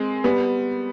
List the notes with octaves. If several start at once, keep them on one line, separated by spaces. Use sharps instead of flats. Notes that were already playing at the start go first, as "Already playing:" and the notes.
Already playing: G#3 C4
G3 B3